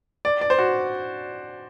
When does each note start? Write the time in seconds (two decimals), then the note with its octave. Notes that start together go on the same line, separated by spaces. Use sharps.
0.25 D5
0.41 D5
0.50 C5
0.59 F#4